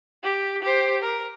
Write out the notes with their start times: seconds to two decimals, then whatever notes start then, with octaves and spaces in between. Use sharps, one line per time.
0.23 G4
0.62 G4 C5
1.02 A#4